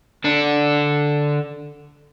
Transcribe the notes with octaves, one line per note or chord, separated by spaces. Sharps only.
D3 D4